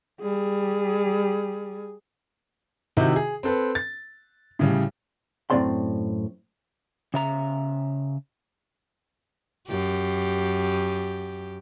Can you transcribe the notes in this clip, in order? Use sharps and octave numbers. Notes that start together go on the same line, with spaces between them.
G3 G#4
C3 D#3 D#4 E4 F#4
G#4
C4 A4 B4
A6
A2 C#3 G3
F#2 A2 A#3 C4 D5 C6
C#3 E5 A#5
F#2 G4